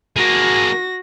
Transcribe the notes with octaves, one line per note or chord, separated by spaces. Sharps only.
A#3 F#4 G#4 A#6